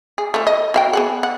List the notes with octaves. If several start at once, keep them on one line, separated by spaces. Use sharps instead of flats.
G#4
A3 F4
D#5
F#4 F5 G5
B3 G#4 F#5
F#5